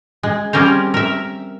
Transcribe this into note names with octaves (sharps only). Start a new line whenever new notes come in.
G#3
G3 C4 C#4 A#4 C5
A#4 E5